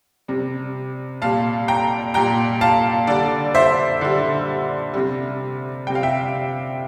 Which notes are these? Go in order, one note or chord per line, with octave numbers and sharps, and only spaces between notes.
C3 G3
A#2 G3 F5 A5
G5 A#5
A#2 G3 G5 A#5
F5 A5
D3 G3 D5
C5 E5
D3 G3
C3 G3
C3 G3 G5
F5
E5 G5